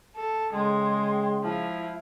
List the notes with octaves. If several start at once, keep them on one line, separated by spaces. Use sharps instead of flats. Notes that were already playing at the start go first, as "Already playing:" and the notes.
A4
C#3 G#3 G5 C6
F3 E4